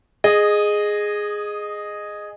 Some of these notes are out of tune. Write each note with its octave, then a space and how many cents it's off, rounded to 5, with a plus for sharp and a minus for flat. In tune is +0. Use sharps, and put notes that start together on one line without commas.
G#4 +0 D#5 -15